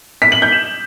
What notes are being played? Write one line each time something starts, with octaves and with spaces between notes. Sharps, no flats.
B6
F#7
G6
E7